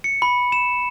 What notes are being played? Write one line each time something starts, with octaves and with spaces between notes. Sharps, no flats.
C#7
B5
E7